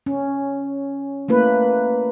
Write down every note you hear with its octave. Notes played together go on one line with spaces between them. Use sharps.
C#4
A3 A#3 E4 B4